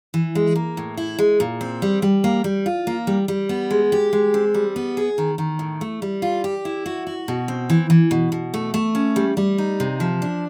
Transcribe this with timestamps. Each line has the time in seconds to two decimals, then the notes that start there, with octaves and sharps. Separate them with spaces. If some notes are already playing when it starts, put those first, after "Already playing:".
0.14 E3
0.35 G#3
0.56 A#3
0.77 A2
0.97 E4
1.19 G#3
1.40 A#2
1.61 C4
1.82 G3
2.02 G3
2.24 A#3
2.44 G3
2.66 F4
2.87 A#3
3.07 G3
3.28 G3
3.49 B3
3.71 G#3
3.92 G4
4.13 G#3
4.34 C4
4.54 G3
4.76 B3
4.97 G#4
5.18 D#3
5.38 D#3
5.59 A2
5.81 A3
6.02 G3
6.22 F4
6.44 G4
6.65 E4
6.86 F#4
7.07 F#4
7.28 B2
7.48 C4
7.70 E3
7.90 E3
8.11 B2
8.32 B2
8.54 A3
8.74 A3
8.95 C#4
9.16 G3
9.37 G3
9.58 D#4
9.80 C3
10.00 F3
10.22 D4